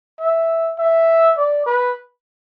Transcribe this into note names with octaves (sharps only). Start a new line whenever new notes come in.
E5
E5
D5
B4